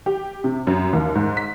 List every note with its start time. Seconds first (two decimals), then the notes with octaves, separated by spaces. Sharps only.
0.06 G4
0.44 C3
0.67 F#2
0.93 D#2
1.15 G#2
1.37 B6